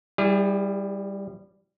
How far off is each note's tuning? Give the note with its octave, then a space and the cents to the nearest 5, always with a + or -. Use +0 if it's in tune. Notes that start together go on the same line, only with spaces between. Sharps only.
G3 +0 E4 +0 G#4 -40